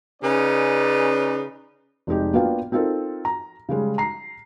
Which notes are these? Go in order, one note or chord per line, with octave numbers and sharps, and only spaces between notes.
C#3 C#4 D#4 B4 D5
F1 G#3 D#4 G4
A#3 B3 D4 F4 F5 G5
C4 D#4 F4 A4 A#4
A#5
C#3 G3 G#3
A#5 C7